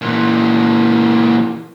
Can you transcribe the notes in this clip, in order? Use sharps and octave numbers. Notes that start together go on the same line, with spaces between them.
A#2 E3